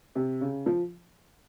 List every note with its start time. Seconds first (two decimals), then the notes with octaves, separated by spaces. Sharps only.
0.15 C3
0.41 C#3
0.66 F3